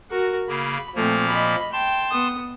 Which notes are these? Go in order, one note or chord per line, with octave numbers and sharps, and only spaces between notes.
F#4 A#4
C#3 A#3 B5
A#2 F3 A3 A#3 C4
D#5 B5
G5 A5 C6
B3 D#6